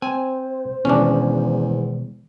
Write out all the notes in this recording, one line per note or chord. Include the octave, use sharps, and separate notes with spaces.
C4 C5 G#5
E2 B2 D#3 G#3 C#4 D4